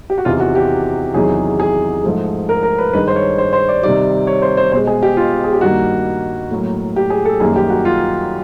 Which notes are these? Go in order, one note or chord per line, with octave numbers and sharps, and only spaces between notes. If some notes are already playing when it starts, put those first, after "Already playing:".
G4
F#4
E2 C3 D#3 F4
F#4
G4
E2 C3 D#3 F#3 G#4
G#4
G#2 F3 A3
A#4
A#4
B4
G2 D#3 G#3 B4
C5
C#5
C5
C5
D5
C3 D#3 G3 D5
C#5
C5
C5
B2 G#3 C5
G#4
G4
F4
G#4
G4
G2 D#3 G3 A#3 F#4
A2 F#3 A#3
G4
G#4
A4
F#2 D#3 G3 A#3 G#4
G4
F#4
F4